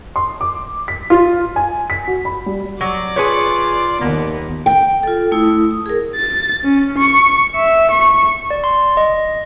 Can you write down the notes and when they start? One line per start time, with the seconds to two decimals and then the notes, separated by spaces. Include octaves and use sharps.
0.16 C6
0.41 D6
0.88 B6
1.10 F4
1.56 G#5
1.90 B6
2.07 F#4
2.25 B5
2.46 G3
2.81 F#3 D5
3.16 F4 G#4 B4 C#5
4.01 D#2 D#3 A#3 B3
4.66 G5
5.03 F4 A4
5.32 A3 E4 D#6
5.71 D#6
5.86 G#4 A#4
6.16 A6
6.64 C#4
6.98 C#6
7.56 E5
7.91 C#6
8.51 D5
8.64 C6
8.97 D#5